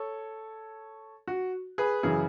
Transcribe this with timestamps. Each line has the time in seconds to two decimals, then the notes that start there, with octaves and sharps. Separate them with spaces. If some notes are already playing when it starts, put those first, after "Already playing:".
Already playing: A4 C#5
1.28 F#4
1.78 G#4 B4
2.03 F#2 C#3 E3 G#4